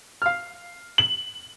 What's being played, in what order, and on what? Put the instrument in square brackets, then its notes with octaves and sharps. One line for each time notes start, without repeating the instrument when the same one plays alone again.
[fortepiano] F5 F6
[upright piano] F#7